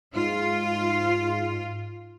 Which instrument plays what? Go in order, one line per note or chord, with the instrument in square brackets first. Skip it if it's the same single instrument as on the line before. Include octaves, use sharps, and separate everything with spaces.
[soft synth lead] G#2 [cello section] F4